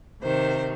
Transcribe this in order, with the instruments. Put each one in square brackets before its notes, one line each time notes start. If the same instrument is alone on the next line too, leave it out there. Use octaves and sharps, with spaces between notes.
[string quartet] C3 D#3 C5